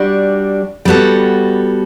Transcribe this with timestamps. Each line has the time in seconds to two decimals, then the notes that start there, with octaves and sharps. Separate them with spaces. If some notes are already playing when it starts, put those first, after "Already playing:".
Already playing: G3 D4 F#4
0.85 G3 B3 F#4 A4